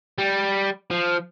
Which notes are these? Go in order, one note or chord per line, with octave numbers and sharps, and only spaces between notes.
G3
F3